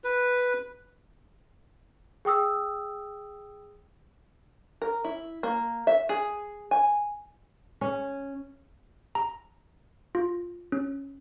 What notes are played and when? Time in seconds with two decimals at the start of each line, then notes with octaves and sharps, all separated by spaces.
0.04 B4
2.25 G#4 G5 D#6 E6
4.82 A#4
5.04 E4
5.43 A#3
5.87 E5
6.09 G#4
6.71 G#5
7.81 C#4
9.15 A#5
10.15 F4
10.72 C#4